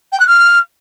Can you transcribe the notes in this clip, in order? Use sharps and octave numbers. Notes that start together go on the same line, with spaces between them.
G5
F#6
F6